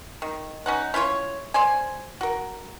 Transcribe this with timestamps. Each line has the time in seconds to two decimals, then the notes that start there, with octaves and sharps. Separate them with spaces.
0.22 D#3
0.66 C#4 D#4 F#5
0.94 C#4 E4 F4 C#5
1.54 C5 D5 G#5
2.21 F#4 A#4